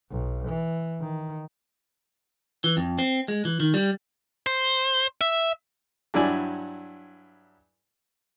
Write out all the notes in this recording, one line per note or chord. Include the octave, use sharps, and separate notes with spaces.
B1
E3
D#3
E3
F2
C4
G#3
E3
D#3
G3
C5
E5
G2 F#3 E4 D5 G#5